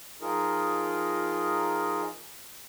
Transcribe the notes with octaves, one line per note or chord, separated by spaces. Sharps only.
F3 D#4 F4 G#4 A#4 D#5